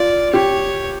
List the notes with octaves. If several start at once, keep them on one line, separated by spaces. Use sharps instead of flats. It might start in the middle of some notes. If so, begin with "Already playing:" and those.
Already playing: F4 D5
G4 C#5